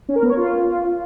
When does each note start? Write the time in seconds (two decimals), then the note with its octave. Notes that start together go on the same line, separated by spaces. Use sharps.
0.09 C#4
0.16 A#4
0.23 B3
0.30 C#5
0.37 F4